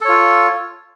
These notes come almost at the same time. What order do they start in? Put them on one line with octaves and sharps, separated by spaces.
A4 C#5 F4